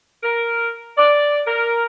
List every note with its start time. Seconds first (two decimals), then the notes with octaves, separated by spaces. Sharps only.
0.23 A#4
0.98 D5
1.47 A#4